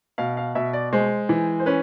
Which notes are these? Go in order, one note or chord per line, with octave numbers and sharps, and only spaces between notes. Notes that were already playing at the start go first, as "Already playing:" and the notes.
B2 F5
F5
B2 E5
D5
G#3 C5
E3
C5
C#4 B4